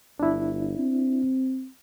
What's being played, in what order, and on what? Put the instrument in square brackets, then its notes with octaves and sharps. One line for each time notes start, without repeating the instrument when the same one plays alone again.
[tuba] G1 [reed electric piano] D4 E4
[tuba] C4